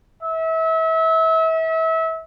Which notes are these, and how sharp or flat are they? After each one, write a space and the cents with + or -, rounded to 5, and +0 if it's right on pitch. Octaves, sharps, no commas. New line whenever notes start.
E5 -30